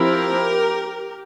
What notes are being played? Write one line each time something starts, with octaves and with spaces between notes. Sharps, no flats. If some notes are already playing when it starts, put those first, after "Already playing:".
Already playing: F3 C4 E4 G4 A#4